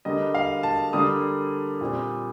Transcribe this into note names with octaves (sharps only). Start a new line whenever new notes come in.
D3 G3 A#3 D#5
F5
A5
D3 G3 A#3 D#6
A#2 G3 C4